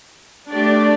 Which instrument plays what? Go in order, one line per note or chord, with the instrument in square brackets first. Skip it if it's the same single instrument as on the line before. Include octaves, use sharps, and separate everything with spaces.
[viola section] A3 D4 G4 D5